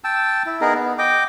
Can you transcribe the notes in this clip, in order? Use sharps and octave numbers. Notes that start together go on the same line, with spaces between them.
G5 A5 E6
E4
B3 D#4 G#4 A#4
B3
D#5 G5 D6